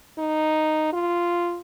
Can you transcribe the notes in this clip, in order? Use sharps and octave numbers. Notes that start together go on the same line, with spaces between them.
D#4
F4